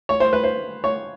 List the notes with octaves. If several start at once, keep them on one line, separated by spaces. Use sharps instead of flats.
C#5
C5
B4
C5
C#5